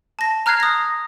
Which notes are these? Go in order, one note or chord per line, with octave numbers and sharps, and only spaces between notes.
A5 A#6
A#5 F6 F#6 G#6 C7
D#6 A#6